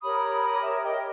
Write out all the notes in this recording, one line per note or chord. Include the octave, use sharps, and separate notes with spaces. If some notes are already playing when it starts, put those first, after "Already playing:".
G4 A#4 C#5 B5 D#6
B5 D#6
B5 D#6
C#5 E5
D#5 G5